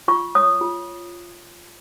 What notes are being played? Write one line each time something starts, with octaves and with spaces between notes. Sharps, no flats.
F4 C#6
C#5 D#6
F4